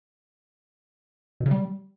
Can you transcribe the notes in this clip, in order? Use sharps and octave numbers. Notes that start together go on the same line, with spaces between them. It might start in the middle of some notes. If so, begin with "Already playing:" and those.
B2
C#3
G3